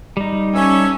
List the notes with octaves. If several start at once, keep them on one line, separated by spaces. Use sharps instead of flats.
G3 D#4
C#4 A4 C#5 E5